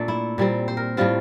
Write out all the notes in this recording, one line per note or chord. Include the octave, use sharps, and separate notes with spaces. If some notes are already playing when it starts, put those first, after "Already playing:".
Already playing: A#2 A3 D4 A4
E4
A#2 G3 C4
C5
A#4
A2 G3 C4 F4